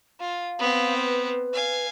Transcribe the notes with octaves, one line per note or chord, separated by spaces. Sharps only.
F4 F5
B3 C4
B4
F5 G#5